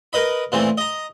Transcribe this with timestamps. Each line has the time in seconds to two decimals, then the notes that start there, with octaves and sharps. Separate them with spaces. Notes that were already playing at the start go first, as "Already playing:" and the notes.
0.13 A#4 B4 D#5 B5
0.52 A#2 E3 A3 C4
0.78 D#5 A#5